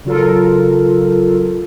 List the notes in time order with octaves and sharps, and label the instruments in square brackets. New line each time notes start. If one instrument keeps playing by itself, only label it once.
[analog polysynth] C#3 F#3 F4 A4 A#4